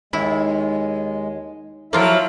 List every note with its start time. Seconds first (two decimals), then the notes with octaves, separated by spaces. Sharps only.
0.13 D#2 G#3 E4
1.93 F3 F#3 A#3 E4 F4 A#4 E5